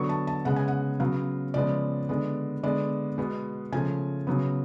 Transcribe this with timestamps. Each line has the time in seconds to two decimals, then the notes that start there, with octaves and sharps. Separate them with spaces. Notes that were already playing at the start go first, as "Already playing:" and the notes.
Already playing: D3 F#3 B3 C#6
0.09 A5
0.27 A5
0.45 C#3 G#3 B3 F#5
0.56 G#5
0.68 F#5
1.00 C#3 F#3 B3 F5
1.54 C#3 F3 G#3 B3 D5
2.09 D3 G#3 B3
2.63 D3 G#3 B3 D5
3.18 B2 G#3 B3
3.72 C#3 F3 A3 G#5
4.27 C#3 F#3 B3